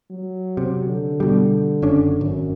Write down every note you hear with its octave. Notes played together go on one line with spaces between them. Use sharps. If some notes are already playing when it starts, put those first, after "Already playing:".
F#3
C3
D3
B2 G3
F#1 C#4 D4
G#1 F#2